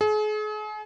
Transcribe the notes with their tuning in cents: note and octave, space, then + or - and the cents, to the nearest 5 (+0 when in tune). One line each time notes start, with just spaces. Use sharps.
G#4 +40